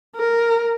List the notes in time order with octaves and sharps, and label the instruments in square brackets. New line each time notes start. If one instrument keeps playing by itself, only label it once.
[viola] A#4